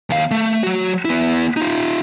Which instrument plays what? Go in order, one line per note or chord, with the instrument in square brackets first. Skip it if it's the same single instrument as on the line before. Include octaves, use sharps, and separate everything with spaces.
[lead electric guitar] D#2 F5
A3
F#3 F#4
B3 E4
D#4 F4